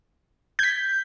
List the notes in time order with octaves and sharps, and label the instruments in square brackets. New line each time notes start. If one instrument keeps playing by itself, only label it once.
[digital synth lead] G6 [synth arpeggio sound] G#6 B6